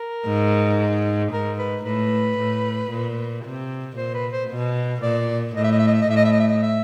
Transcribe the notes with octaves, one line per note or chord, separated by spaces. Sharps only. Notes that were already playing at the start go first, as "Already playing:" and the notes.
Already playing: A#4
G#2
G#2 A#4
B4
A2 B4
A2
A#2
C3
A#2 C5
B4
C5
B2
A#2 D5
A2 D#5
E5
D#5
E5
D#5
E5
D#5
A2 E5
D#5
E5
D#5
E5
D#5
E5